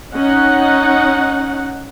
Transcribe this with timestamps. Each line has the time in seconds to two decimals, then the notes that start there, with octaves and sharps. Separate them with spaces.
0.15 C#4 D#4 F#5